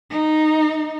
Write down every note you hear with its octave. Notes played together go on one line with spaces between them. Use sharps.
D#4